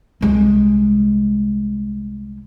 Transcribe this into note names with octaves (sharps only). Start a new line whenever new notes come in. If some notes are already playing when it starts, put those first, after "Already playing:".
C2 G#3